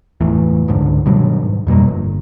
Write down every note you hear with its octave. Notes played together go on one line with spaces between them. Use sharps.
F#1 E2 A2 E3
C#2 G#2 D3
G2 B2 D#3 F#3
G#2
F2 B2 G3 A#3
D1 G1